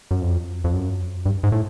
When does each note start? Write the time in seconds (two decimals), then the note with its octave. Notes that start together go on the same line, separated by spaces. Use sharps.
0.11 F#2
0.21 F2
0.64 F2
0.73 F#2
1.26 G2
1.43 G#2
1.52 A2